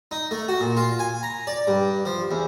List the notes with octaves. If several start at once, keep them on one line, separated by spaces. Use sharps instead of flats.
D#4
A3
F#4
A#2
F4
G#5
A#5
D5
G2
F3
E2